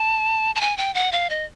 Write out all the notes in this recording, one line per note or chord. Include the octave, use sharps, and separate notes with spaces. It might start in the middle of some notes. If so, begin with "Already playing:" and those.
Already playing: A5
A5
G#5
G5
F#5
F5
D#5